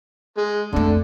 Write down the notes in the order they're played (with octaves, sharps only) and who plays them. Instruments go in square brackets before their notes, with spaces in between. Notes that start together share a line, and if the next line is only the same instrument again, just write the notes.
[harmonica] G#3
[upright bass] F2 A3 [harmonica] D3